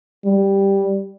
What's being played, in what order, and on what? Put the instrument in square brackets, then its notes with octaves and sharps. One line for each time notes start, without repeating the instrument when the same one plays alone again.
[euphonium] G3